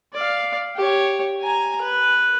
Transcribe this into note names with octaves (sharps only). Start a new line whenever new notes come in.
D5 F5
G4 C#5
G#5 A#5
B4